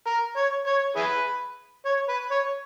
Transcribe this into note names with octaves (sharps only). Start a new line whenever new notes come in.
A#4
C#5
C#5
E4 G#4 B4
C#5
B4
C#5